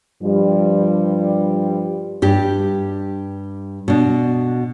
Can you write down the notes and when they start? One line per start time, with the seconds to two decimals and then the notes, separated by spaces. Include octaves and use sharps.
0.23 G2 F3 G3
2.22 G2 G4
3.88 B2 D4